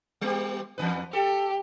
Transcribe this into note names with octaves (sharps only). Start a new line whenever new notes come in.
G3 B3 G4
E2 C3 B4
G4 A4